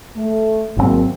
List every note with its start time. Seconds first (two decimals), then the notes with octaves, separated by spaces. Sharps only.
0.17 A3
0.77 G#1 D3 F#3 G#3 A#3 C4